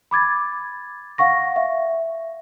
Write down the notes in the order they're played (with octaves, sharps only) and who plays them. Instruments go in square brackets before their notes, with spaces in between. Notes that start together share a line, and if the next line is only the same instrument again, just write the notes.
[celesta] B5 D6 G#6 A6
F5 F#5 C#6 A#6
E5